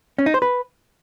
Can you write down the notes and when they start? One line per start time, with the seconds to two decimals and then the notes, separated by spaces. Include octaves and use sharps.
0.18 C#4
0.26 D#4
0.34 C5
0.42 B4